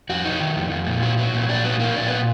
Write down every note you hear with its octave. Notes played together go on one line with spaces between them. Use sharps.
F2 F#4
F#3 D#4
D#3
F2
F2
A#2
F#3
F#3
A#2
A#2 D4
F#3 B3
F#3 A#3
A#2 D4
B3